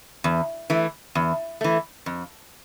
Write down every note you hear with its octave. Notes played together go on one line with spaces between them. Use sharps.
E2
E3 A3
E2
E3 A3
F2